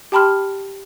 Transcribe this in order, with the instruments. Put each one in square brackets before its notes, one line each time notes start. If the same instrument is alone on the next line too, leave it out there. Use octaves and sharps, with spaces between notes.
[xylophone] G4 G5 A5 B5 C6 F6